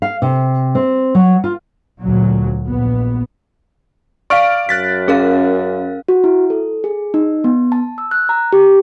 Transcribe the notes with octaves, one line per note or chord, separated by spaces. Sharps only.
F5
C3
C4
F#3
F4
D2 A#2 F#3
A#1 B3
D5 F5 C#6 F6 D7
F#2 F#6 A6 B6
C#4 G#4 A#4 F5
F#4
E4
A4
G#4
D#4
B3
A5
E6
F#6
A#5
G4